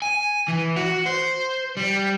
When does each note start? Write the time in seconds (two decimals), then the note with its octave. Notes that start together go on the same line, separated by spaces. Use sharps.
0.02 G#5
0.48 E3
0.76 F#4
1.06 C5
1.77 G3